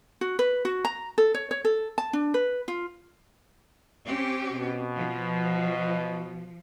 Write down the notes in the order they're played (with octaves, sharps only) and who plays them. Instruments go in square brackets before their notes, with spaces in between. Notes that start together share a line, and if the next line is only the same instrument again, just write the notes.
[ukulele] F#4
B4
F#4
A#5
A4
C#5
C#5
A4
A5
D4
B4
F4
[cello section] C4 C#4 G4
[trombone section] B2
[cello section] F3